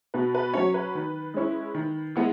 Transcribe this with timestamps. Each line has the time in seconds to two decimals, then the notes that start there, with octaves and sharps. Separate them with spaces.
0.14 B2 B4
0.35 B4
0.54 F#3 C#4 C#5
0.74 B4
0.95 D#3
1.34 G#3 C#4 E4
1.75 D#3
2.16 G#3 B3 E4